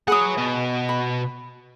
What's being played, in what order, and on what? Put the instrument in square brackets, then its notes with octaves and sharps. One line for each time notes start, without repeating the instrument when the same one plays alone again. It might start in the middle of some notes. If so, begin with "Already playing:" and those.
[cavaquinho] G#4 B4 D#6 [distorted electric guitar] C#5 F#5
[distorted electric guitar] B2 D#5
[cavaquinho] B5